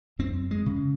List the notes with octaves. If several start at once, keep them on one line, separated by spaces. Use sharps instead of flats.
F#2 C4
G#3
C#3